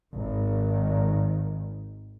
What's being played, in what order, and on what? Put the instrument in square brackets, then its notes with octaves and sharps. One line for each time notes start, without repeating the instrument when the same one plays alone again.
[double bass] G#1 D#3